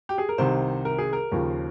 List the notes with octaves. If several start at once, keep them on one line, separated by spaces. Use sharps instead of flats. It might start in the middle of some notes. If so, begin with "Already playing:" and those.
G4
G#4
A#4
C2 C3 D#3 C5
A#4
G#4
A#4
D#2 C#3 F3